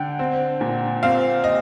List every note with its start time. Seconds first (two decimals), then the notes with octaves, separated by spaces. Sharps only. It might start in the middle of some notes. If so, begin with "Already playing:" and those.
Already playing: D3 G5
0.19 C4
0.61 A#2
1.03 C4 F5
1.44 D#5